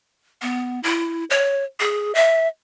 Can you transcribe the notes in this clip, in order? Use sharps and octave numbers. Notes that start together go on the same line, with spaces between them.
B3
E4
C#5
G#4
E5